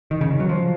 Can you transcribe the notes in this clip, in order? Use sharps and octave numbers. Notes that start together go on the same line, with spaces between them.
D#3
C#3
D#3
F#3
F3